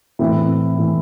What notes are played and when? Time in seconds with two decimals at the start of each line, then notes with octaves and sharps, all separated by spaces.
0.19 A2 E3 C4 E4
0.78 A2 E3